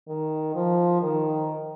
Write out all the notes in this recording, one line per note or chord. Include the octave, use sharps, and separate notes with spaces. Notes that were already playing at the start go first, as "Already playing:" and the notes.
D#3
F3
D#3